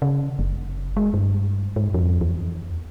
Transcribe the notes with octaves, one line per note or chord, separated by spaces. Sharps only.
C#3
F#1
G#3
G2
G#2
F2
E2